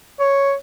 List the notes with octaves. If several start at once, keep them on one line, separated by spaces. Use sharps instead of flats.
C#5